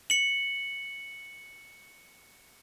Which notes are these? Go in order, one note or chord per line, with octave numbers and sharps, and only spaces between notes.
C#7 F#7